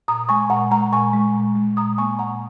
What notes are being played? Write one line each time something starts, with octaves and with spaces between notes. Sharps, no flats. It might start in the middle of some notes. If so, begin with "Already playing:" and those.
A#2 A#5 D#6
G#3 G#5 C#6
A#2 F#5 A#5
G#3 F#5 A#5
A#2 G#5 C#6
G#3
A#2
G#3
A#2 A#5 D#6
A#3 G#5 C#6
A#2 F#5 A#5